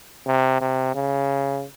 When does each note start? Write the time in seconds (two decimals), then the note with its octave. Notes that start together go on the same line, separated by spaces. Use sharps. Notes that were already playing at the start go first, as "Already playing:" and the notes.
0.27 C3
0.61 C3
0.94 C#3